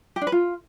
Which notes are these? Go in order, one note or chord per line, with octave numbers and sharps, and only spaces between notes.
G4
D4
B4
F4